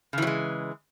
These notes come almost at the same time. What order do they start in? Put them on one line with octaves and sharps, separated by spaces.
C#3 E3 F#3 G#3